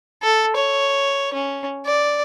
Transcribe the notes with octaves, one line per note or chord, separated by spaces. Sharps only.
A4
C#5
C#4
D5